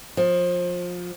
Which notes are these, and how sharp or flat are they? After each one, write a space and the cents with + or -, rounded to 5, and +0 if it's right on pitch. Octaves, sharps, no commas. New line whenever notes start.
F3 +25